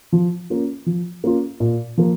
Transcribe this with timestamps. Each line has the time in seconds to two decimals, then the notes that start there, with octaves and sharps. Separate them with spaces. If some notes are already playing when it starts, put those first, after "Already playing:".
0.13 F3
0.50 A#3 C#4 F4
0.87 F3
1.24 A#3 C#4 F4
1.60 A#2
1.98 F3 A#3